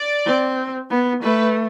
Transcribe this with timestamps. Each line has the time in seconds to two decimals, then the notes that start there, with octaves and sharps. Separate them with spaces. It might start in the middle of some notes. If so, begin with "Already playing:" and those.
Already playing: D5
0.26 C4
0.90 B3
1.22 A3 B4